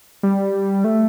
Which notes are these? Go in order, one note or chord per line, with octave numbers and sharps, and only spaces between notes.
G3
A3